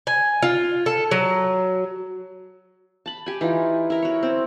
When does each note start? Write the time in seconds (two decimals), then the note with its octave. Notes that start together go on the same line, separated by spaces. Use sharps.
0.07 G#5
0.43 F4
0.86 A4
1.11 F#3
3.06 A5 B5
3.26 G4 G#5
3.41 E3 D#4 F4
3.90 E4 A#4
4.02 F#4 C#5
4.23 C4